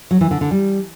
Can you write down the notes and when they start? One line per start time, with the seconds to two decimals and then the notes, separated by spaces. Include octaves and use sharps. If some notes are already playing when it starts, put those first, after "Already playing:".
0.11 F#3
0.21 E3
0.31 D3
0.41 D3
0.51 G3